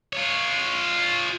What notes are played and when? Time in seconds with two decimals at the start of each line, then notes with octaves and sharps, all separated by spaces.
0.13 F4 C#5